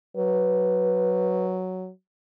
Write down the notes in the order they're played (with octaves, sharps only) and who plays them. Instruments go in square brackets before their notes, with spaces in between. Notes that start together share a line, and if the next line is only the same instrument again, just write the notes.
[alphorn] F#3 [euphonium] B4